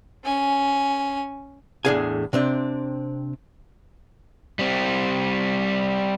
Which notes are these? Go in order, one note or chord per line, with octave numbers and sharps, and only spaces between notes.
C#4 G#5
E2 A2 D4 G#4 F5 G#5
C3 C4 D4
G3 C4